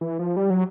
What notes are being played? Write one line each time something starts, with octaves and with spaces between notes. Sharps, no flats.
E3
F3
G3
F#3